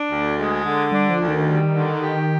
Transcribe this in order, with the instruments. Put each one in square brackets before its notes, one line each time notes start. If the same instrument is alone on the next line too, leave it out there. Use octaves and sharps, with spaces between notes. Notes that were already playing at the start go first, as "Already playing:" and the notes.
Already playing: [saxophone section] D4
D2
G#3
D3
[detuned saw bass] G3 [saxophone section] D4
[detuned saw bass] F3
[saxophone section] D2
[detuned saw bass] D#3
[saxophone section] G3
D3
G4